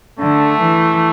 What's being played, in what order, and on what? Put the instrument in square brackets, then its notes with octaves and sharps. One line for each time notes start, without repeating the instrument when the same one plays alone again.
[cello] D3 [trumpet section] A3
[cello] E3